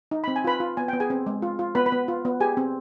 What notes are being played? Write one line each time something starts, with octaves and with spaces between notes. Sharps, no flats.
D#4
C4 B5
G#5
F4 B4 B5
F4
B3 G#5
B3 G5
G#4 G#5
C4
G#3
F4
F4
B3 B4 B5
B4 B5
B3
F4
B3
G4 G#4 G#5
C4